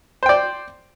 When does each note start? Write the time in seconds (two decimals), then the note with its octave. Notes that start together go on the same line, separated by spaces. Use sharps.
0.23 C5
0.26 G5
0.29 D5